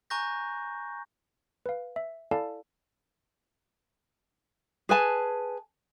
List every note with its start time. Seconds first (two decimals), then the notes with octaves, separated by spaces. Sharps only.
0.10 G#5 A#5 C#6 F#6 G6 A#6
1.66 B4 F5
1.96 E5
2.31 E4 A4 D5 F5 G#5 A5
4.89 G#4 B4 G#5 A5